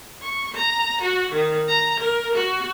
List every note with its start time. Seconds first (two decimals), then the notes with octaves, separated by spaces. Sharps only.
0.22 C#6
0.54 A#5
1.02 F#4
1.33 D#3
1.69 A#5
2.00 A#4
2.35 F#4